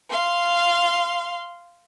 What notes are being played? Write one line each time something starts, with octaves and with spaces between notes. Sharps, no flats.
F5 C6